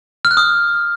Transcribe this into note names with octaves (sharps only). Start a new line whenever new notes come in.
F6
F#6
D#6